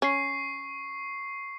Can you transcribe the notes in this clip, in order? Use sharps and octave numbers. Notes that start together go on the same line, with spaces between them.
C#4 C#6 C7